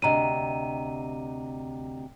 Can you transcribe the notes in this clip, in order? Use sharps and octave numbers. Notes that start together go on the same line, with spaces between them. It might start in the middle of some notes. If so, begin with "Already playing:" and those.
D2 C3 D#5 A#5 D#7